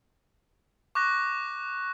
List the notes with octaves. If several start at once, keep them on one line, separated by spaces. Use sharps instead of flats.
C#6 D6 F#6 A#6